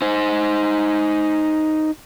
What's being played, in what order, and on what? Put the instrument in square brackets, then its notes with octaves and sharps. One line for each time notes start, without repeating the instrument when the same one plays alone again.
[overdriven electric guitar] D#4 C5